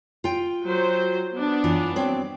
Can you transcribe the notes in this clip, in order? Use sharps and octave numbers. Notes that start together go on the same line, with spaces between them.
F4 G5
F#3 C5
B3 D4
F#2 E3 F4
F#3 C4 D5